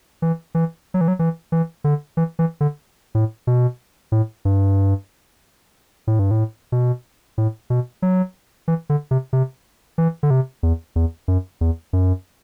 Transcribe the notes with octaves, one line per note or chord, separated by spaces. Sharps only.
E3
E3
F#3
E3
F#3
E3
E3
D3
E3
E3
D3
A2
B2
A2
G2
A2
G2
A2
B2
A2
B2
F#3
E3
D3
C3
C3
E3
D3
C3
E2
E2
F#2
E2
F#2